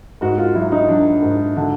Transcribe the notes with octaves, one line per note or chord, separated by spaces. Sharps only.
G#2 F#4
F4
F#3 E4
D#4
F#3 D4
G#2
D3